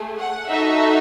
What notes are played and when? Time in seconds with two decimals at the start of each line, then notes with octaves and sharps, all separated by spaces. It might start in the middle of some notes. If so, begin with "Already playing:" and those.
Already playing: A3 G#4
0.19 F#5
0.49 D#4 F#4 A4 E5